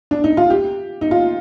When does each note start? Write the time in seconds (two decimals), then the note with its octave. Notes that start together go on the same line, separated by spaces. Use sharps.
0.11 D4
0.24 D#4
0.37 F4
0.50 G4
1.01 D#4
1.11 F4